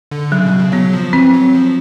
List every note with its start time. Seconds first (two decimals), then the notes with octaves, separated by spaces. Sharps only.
0.11 D3
0.32 C#3 F#3
0.46 B2
0.59 C#3
0.72 F#3 B3
0.93 F3
1.13 E3 C4
1.34 F#3
1.54 F3